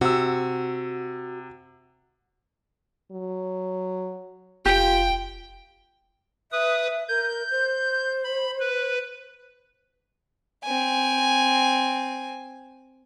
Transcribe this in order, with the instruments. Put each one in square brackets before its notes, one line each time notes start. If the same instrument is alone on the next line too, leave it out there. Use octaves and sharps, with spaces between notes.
[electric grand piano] C3 E6 [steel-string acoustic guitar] F#4
[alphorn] F#3
[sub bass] F1 [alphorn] F4 [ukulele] G4 [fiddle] G5
[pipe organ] B4 D#6 [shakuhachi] E5
[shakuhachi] A#4 [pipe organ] G6
[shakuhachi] C5
[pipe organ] B5
B4
[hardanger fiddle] C4 G#5